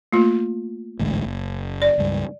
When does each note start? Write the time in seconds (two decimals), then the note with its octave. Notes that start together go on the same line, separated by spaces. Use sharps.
0.13 A3 A#3 F4
0.99 A1 D2 G#2
1.24 F#1
1.82 D5
1.98 C#2 G2